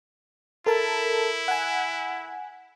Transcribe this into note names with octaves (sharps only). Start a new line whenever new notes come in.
E4 A4 A#4 A5
F#5 G#5